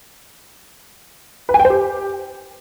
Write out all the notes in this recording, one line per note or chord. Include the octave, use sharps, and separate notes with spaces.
B4
G#5
G5
C5
G4